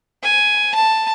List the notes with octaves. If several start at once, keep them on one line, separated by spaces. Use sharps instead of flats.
G#5
A5